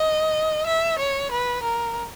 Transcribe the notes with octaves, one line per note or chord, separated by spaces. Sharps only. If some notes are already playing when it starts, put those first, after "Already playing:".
Already playing: D#5
E5
C#5
B4
A#4